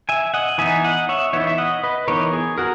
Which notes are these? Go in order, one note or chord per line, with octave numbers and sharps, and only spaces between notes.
E5 G#5
D#5 F#5
E3 B3 D#4 E5 G#5
D#5 F#5
C#5 E5
E3 B3 D#4 C#5 E5
E5
D#5 F#5
B4 D#5
E3 B3 D#4 A#4 C#5
G#4
F#4 A#4